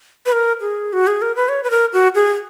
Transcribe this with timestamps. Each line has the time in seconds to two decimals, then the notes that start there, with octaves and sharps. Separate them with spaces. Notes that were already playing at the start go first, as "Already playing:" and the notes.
0.26 B4
0.32 A#4
0.61 G#4
0.93 F#4
1.07 G#4
1.22 A#4
1.36 B4
1.49 C#5
1.63 B4
1.70 A#4
1.93 F#4
2.15 G#4